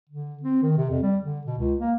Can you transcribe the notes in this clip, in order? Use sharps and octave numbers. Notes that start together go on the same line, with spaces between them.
D3
C4
D#3
C3
F2
G3
D3
B2
C#2
A#3